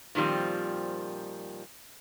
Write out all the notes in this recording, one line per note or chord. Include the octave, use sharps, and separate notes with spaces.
A#2 D#3 F3 G3 C4